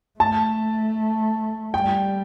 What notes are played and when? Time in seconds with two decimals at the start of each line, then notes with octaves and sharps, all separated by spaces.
0.20 A3 A5
1.74 G3 G5